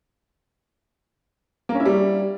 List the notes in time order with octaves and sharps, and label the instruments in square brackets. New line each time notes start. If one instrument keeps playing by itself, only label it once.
[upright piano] A#3
C#4
E4
G3